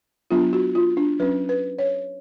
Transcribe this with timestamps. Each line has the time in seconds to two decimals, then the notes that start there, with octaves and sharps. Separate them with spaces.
0.31 F#3 B3 D4 F4
0.53 F#4
0.75 F4
0.97 D4
1.20 F#3 C#4 B4
1.49 B4
1.79 C#5